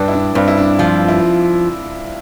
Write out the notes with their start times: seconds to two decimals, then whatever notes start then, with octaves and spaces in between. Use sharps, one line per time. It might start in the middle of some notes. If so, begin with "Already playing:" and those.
Already playing: G2 D4
0.08 E4
0.13 D4
0.35 G2 C4
0.48 E4
0.57 D4
0.79 F3 F4
1.08 E4